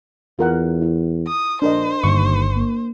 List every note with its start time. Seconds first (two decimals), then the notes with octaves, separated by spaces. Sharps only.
0.39 E2 F4 A#4 F#5
0.82 E4
1.27 D#6
1.62 A#1 D4 A#4 C5 D#5
2.04 G1 D#2 C#6
2.56 A#3